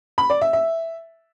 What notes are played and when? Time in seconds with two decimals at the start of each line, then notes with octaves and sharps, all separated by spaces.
0.18 B5
0.30 D5
0.41 E5
0.53 E5